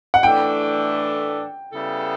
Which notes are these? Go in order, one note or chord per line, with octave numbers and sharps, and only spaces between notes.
F#5
A2 E3 A3 D4 A4 G5
C#3 G3 B3 E4 A4